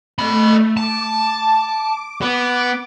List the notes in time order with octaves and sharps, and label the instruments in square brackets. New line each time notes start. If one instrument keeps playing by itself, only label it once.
[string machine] A3 [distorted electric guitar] D#5 B5
[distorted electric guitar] A5 [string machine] D6
[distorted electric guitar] B3